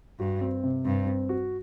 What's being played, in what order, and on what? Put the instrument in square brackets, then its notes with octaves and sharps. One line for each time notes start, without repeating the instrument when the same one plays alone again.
[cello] G2 [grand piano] F#4
[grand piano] C4
C3
[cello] G2 [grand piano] C4
[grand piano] C4
F#4